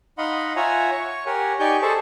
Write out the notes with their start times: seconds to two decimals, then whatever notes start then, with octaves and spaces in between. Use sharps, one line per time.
0.18 D#4 D#5 F5 F#5 B5 C6
0.56 F4 C#5 E5 F#5 G#5 A#5
0.92 C#5 C#6
1.26 G4 A#4 C#5 F#5 G#5
1.59 D#4 G4 D5 G#5 C#6 G6
1.82 G#4 A4 C5 A5 C#6